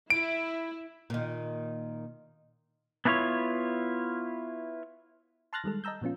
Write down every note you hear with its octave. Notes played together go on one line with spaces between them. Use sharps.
E4 D7
A#2 D#3
B3 D4 E4 F4 C#5
A5 C6 F6 F#6 A6 A#6
D#3 G3 G#3 A4
D#5 A5 A#5 E6 G6
A#2 F3 B3 C#4 F4